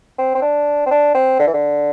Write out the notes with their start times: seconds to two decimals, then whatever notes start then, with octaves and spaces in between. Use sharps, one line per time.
0.18 C4
0.35 C4
0.42 D4
0.86 C4
0.91 D4
1.15 C4
1.39 D3
1.47 E3
1.54 D3